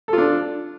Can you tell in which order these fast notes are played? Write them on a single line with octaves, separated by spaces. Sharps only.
A4 F4 D4